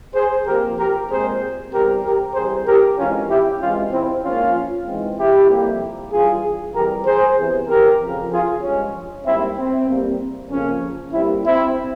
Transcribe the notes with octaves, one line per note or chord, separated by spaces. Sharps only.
G#4 C5
C3 F3 A#3 G4 A#4
G4 A#4
A#2 G#3 C4 G#4 C5
E2 C3 G3 C4 G4 A#4
G4 A#4
C3 E3 G3 C4 G#4 C5
G4 A#4
F2 E3 G#3 C4 C#4 F4
E4 G4
C3 E3 G#3 C4 C#4 F4
C4 E4
G#2 F3 A#3 C#4 F4
G#2 E3 G#3 C4
E4 G4
F2 C3 G3 A#3
G2 E3 G3 F4 G#4
F2 E3 G3 G4 A#4
G#4 C5
E2 C3 E3
G4 A#4
F2 C#3 F3
F4 G#4
G2 F3 G#3 C#4
G#2 G3 A#3 C4 E4
C4
E2 C3 G3 A#3
F2 C#3 F3 A#3 C#4
G2 G3 A#3 C4 E4
C4 E4